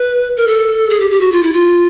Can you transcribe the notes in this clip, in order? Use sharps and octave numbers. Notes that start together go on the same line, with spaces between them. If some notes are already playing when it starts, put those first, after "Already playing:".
Already playing: B4
A#4
A4
G#4
G4
G4
F#4
F4
E4
F4